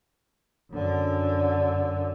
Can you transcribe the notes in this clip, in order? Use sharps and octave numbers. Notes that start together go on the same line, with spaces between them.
F#2 D3